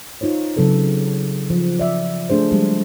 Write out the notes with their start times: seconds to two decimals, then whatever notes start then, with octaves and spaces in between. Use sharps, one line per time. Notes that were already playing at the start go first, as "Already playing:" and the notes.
0.21 D#4 F4 C5 C#5
0.56 C#3 F#3 C4 A4 B4
1.50 F3
1.79 D5 E5
2.30 A3 D4 G#4 C5
2.52 F3 G3 G#3